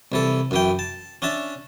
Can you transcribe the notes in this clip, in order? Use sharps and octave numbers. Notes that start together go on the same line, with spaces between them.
C2 E3 A4
F#2 E3 G5
A5
C#4 D4 E5 A5